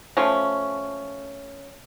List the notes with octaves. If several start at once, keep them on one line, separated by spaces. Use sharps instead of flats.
F3 A3 C#4